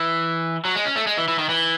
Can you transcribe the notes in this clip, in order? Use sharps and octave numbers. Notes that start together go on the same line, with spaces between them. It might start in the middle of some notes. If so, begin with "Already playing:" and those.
Already playing: E3
F#3
G#3
C#4
A3
G#3
E3
E3
D#3
E3